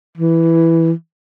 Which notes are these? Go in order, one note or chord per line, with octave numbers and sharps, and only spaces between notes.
E3